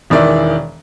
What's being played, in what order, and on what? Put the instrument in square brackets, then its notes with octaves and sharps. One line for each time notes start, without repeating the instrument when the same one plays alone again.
[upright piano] E1 D#3 E3 D5 E5